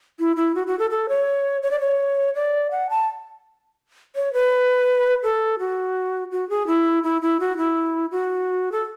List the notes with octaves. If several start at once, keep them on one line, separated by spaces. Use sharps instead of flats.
E4
E4
F#4
F#4
A4
A4
C#5
C#5
D5
C#5
D5
F#5
A5
C#5
B4
A4
F#4
F#4
G#4
E4
E4
E4
F#4
E4
F#4
A4